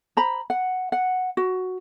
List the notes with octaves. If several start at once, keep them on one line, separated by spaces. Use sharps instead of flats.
C5 A#5 B5
F#5
F#5
F#4